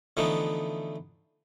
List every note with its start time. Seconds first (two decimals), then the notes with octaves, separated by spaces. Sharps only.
0.17 D3 E3 F3 A3 B3 D#4